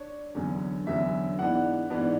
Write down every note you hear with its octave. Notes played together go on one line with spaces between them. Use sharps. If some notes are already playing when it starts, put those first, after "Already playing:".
Already playing: D4 C#5
E2 D3 F#3 C#4
E2 D3 F#3 C#4 E5
G#2 E3 B3 D4 F#5
G#2 E3 B3 D4